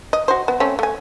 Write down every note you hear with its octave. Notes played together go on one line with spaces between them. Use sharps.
D#5
F#4 C5
B3
A3 C4 C#4
A3 G#5